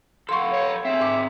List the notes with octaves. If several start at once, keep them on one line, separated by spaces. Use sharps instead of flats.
A4 F5 F#5 C6 C#6
C#5
C4 G#4 E5
G#2 D6